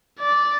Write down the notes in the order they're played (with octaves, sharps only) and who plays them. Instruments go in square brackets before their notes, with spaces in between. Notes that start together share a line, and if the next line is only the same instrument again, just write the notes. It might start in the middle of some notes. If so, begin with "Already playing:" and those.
[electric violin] D5